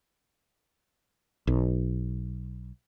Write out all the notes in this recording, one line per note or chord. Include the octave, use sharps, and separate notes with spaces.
B1